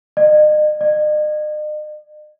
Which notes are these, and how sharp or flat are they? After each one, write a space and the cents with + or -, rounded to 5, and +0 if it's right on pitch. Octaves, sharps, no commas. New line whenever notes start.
D#5 -40
D#5 -45